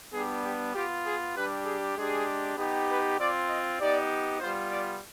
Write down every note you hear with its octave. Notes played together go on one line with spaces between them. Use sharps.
G3 B3 D4 G4 G#4
G4
B3 F4 G4
G#4
G3 D4 G4 B4
G#4
G#3 D4 G4 G#4
B3 D#4 G4
B4
C4 F4 D5
D#5
B3 D#4 G4 D5
G3 B3 F4 C5
D5